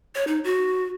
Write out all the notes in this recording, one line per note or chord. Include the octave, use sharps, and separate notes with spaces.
C#5
D#4
F#4